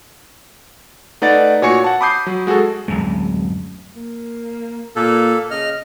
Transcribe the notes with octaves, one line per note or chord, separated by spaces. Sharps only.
A3 D#4 B4 D5 F#5 A6
A#2 F#4 C#5 G#5 C#6 C#7
F#5 A5
B5 D6 D#6 G6 C7
F#3
G#3 F#4 G#4 A4
D1 B1 F#2 G#3
A#3
A#2 A#3 A4
C#3 D#5 F6